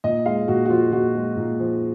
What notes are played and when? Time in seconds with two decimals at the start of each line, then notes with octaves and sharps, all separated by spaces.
0.04 A#2 D#5
0.26 G#3 F5
0.48 A#2 F#4
0.65 F#4
0.70 F3 F4
0.92 A#2 F#4
1.15 G#3
1.37 A#2
1.60 F3